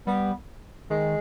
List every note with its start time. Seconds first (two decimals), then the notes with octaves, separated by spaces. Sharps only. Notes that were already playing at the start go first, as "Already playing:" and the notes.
0.07 G3 B3
0.90 D#3 G#3